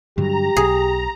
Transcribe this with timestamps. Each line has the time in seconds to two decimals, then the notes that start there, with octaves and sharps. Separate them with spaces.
0.18 G2 D3 F#3 G4 A#5
0.57 B1 G#4